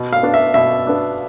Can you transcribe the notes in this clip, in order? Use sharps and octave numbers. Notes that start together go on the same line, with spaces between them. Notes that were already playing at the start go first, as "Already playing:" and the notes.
Already playing: B2
F5
B3 D4
E5
B2 E5
B3 D4